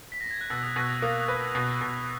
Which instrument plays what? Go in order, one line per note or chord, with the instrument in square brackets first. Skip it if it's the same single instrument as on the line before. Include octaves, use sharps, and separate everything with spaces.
[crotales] B6
A#6
G#6
F#6
[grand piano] B2 [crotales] E6
[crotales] D#6
[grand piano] B2 [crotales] C#6
[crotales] E6
D#6
[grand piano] A#3 [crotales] D#6
[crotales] D#6
[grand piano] B4
[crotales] E6
[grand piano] B2
B2